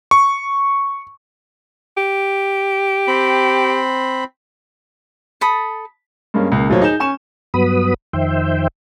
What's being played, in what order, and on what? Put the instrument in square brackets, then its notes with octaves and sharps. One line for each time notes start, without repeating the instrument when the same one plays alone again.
[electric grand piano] C#6
[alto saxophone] G4
[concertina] C4 B5
[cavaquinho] A4 A5 B5 D#6
[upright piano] G2 G#3 A#3 C#4
C#2 A#3
D#2 A2 F#3 F4 C5 C#5
D#4 G#4 G6 E7
C#4 G#5 C#6 E7
[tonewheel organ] G2 F#3 B3 B4 B5 D#6
F2 D#3 C5 E5 G5